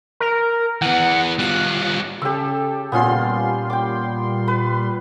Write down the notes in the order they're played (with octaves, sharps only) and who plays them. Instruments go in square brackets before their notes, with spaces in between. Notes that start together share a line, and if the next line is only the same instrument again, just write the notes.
[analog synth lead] A#4
[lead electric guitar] E3 B3 [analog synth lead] F#5
[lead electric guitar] G3 F4 [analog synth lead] F#6
[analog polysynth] C#3 A4 [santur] G4 E6
[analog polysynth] A#2 G3 C6 [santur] B3 C#4 F4
[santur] G5 D6
B4